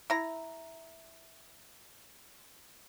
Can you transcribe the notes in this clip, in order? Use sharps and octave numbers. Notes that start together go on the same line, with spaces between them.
E4 A#5